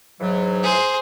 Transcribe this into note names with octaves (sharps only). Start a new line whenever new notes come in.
G#2 E3 F#3
G#4 C5